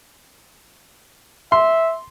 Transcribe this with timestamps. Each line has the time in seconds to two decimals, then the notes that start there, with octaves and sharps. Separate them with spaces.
1.52 E5 C6